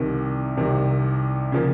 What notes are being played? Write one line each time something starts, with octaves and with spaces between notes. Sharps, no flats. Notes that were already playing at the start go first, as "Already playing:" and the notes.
Already playing: C2 C3 D#3
C2 C3 D#3
C#3 F3 A#3